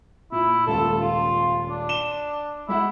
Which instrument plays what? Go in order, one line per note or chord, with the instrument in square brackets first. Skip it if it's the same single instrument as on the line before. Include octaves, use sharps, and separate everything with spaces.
[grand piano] A#2 [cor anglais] E4
[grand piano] D#1 C#2 A5 [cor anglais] A4
[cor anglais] F4
D4
[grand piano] E7 G7
[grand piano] G#3 E5 F#5 [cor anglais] E4